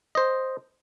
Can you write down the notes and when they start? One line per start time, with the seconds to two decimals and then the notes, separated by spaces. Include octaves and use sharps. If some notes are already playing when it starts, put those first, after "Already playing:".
0.15 C5 D#5